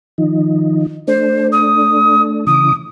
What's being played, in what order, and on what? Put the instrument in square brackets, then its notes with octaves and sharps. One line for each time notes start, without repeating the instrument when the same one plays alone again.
[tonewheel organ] D#3 F3 D#4
[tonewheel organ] A3 D4 [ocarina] C5
[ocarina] D#6
[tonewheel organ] C#3 E3 D6 [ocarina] D#6